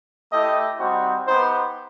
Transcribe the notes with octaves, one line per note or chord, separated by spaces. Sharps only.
A3 E4 G4 D#5
G3 C4 D#4 F#4
B3 D#4 G4 C5